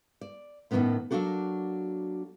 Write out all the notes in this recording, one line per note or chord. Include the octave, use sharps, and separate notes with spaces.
D5
A2 D#3 F3 A#3 B3 C#4
F#3 G3 A#3 D4 F#4 A4